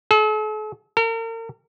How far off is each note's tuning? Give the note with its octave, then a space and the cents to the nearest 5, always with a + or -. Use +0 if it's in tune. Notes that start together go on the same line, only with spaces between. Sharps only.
A4 -45
A#4 -40